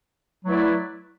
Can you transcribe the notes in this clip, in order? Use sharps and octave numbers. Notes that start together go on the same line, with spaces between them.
F#3 A3 E4 B4 D5